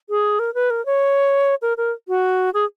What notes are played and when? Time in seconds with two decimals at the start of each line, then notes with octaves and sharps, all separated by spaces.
0.10 G#4
0.39 A#4
0.54 B4
0.70 A#4
0.86 C#5
1.62 A#4
1.77 A#4
2.08 F#4
2.54 G#4